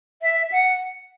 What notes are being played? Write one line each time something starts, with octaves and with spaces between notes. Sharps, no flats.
E5
F#5